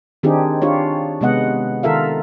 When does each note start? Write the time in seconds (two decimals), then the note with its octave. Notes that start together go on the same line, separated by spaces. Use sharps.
0.23 D#3 C4 D4 D#4 G4 G#4
0.62 D4 F4 G4 C#5
1.21 C3 G#3 B3 D#5 F#5
1.83 D#3 F4 A4 A#4 E5 F5